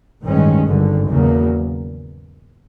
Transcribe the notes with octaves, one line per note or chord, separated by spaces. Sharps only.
A1 G2 D#3 G#3 C#4
G#1 G2 D3
E2 C#3 F#3 A#3